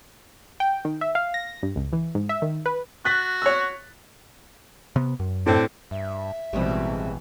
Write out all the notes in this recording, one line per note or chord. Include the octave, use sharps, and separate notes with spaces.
G5
D#3
E5
F5
A#6
G2
C#2
E3
G#2
E5
D#3
B4
F#4 F#6 A6 B6
C#5 E6
C3 B3
F#2
A2 D3 C4
G2 E5
A1 B2 E3 G3 G#3 C4